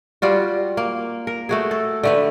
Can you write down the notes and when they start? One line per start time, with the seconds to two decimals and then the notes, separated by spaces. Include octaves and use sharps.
0.22 G3 F4 F#4
0.77 A#3
1.27 A#4
1.49 A3 F#4 G#4
1.71 A4
2.03 D3 A3 B4